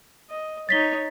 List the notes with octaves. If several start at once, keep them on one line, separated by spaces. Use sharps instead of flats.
D#5
D#4 C#5 A6 B6 G7